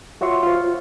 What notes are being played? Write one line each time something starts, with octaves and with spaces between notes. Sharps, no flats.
F4 F#4 C#5 E5 C6 C#6
F4 C5